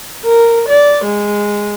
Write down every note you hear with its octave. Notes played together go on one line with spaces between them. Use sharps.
A#4
D5
G#3